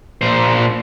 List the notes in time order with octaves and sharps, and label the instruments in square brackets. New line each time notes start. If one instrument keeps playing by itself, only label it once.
[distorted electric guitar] A#2 C5